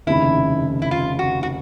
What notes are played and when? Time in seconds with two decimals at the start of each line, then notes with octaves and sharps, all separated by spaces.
0.07 F1 D#2 C#3 E4
0.82 E4
0.91 F4
1.19 F#4
1.43 F#4